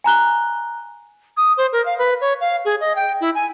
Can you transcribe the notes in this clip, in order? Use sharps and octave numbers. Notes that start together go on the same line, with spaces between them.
G#5 A#5 F#6 G7
D#6
C5
A#4
F5
B4
C#5
F5
G#4
D#5
G5
E4
G#5